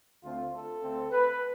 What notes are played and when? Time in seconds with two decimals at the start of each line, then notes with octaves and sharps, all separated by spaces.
0.23 D2 D3 A3 C4 F4
0.53 A4
0.81 D2 D3 A3 C4
1.10 B4